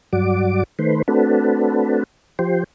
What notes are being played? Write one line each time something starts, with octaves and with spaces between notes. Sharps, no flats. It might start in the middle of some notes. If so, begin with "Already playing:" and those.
G2 F#3 F#4 D5 D6
D#3 A3 B4 C5
A3 C4 D4 F#4 A4 B4
F3 G4 C5